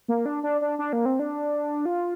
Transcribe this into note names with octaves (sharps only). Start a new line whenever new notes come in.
A#3
D4
D4
D4
D4
A#3
C4
D4
F4